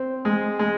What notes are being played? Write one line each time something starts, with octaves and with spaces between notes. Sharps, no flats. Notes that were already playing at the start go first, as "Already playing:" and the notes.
Already playing: C4
G#3
G#3